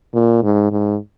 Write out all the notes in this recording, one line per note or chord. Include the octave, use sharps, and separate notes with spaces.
A#2
G#2
G#2